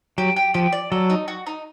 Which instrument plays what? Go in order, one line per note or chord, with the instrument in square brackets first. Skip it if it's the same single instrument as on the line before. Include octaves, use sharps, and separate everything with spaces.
[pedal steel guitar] F#3 [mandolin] G4
[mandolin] G4
[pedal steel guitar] F3 [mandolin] G4
[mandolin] D5
[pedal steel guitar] F#3 [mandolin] A4
[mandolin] D#4
F#4
D#4